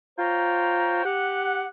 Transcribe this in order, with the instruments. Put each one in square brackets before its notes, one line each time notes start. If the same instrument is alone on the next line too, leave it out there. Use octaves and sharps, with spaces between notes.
[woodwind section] F4 C5 C#5 G5 A#5
G4 F#5